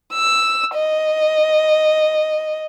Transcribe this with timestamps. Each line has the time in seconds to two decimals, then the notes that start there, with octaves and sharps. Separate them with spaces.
0.14 E6
0.76 D#5